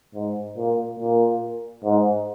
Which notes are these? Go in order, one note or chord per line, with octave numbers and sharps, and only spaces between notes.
G#2
A#2
A#2
G#2